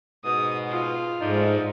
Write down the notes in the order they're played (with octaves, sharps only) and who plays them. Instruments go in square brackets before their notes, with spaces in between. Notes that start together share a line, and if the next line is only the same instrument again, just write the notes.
[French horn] G#2 [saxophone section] B2 [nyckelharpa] D#6
[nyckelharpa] F4
[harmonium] G#2 [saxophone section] F3 A3 D4 [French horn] D#4